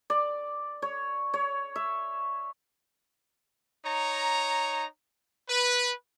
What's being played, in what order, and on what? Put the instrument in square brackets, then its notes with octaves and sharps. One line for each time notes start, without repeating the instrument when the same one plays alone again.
[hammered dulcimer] D5
C#5
C#5
E5
[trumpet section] D#4 C#5 A#5
B4